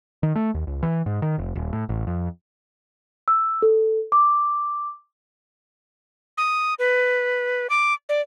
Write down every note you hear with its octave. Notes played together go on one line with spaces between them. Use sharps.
D#3
A3
D#2
C#2
E3
G#2
D#3
F1
D#1
A2
A1
F2
E6
A4
D6
D#6
B4
D6
D5